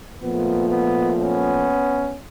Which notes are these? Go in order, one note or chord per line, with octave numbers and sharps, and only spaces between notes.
A#2 F3 A3 B3
B3
B3 C#4